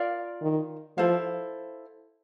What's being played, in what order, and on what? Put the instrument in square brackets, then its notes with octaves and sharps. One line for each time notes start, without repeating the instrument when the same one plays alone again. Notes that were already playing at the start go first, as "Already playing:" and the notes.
Already playing: [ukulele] F4 A#4 D5 F5
[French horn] D#3
[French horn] F3 [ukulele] E4 A4 C5 F5